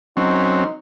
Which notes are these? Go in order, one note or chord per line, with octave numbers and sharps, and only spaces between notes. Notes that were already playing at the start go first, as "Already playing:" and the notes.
F#3 C4 C#4 D#4